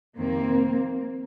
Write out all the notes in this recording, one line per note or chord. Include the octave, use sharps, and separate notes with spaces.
F2 C3 D#3 A#3 C4